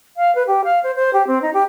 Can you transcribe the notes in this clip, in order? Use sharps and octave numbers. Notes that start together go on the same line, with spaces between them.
F5
B4
G4
F5
C5
C5
G4
C4
D#4
G4